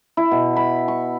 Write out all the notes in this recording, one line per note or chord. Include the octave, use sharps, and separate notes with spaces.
E4
B2
B5
C#6